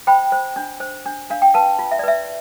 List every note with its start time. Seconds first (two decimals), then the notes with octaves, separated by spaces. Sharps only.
0.07 C5 G5 B5
0.32 C5
0.56 D4
0.80 C5
1.06 D4
1.30 D4 F5
1.42 G5
1.54 B4 F5 A5
1.79 F4
1.91 E5
1.99 D5
2.03 B4 E5